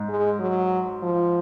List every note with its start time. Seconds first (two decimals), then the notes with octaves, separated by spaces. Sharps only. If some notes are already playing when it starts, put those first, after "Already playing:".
Already playing: G#2
0.09 G#3
0.40 F#3
1.02 F3